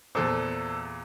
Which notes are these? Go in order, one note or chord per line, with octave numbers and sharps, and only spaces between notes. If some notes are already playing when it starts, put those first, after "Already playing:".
E2 A#2 A4 C5